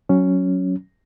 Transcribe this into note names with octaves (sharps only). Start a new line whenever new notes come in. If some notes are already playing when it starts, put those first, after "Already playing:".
F#3 C#4